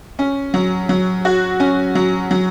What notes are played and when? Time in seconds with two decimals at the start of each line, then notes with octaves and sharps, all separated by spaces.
0.19 C#4
0.54 F#3
0.89 F#3
1.25 F#4
1.60 C#4
1.95 F#3
2.31 F#3